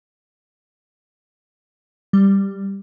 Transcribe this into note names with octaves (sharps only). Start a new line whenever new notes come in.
G3